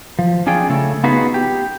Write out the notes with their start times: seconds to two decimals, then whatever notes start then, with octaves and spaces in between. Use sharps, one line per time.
0.19 F3
0.47 C#4 D4 F4 G#4 G5
0.69 C#3 A3 A4
1.04 B3 D#4 F4 F#4 G#4 B4
1.34 G4